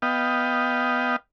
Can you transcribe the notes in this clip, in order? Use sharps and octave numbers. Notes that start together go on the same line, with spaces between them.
B3 D#5 F5 G5